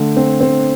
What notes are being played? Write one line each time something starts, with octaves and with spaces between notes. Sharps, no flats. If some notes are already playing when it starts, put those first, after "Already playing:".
Already playing: D3 A3
C4
C4